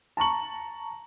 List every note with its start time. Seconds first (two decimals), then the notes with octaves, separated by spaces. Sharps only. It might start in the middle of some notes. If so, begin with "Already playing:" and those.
0.17 A5 A#5 C#6 F#7